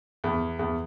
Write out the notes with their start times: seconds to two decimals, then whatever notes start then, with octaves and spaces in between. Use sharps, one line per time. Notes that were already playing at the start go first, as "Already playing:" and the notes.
0.24 E2
0.59 E2